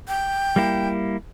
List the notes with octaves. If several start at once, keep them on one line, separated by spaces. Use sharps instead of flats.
G5
G3 A#3 E4